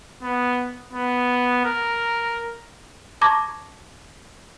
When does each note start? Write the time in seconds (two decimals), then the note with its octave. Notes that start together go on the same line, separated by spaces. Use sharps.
0.22 B3
0.93 B3
1.65 A#4
3.21 A5 A#5 C#6 D6 G#6 A#6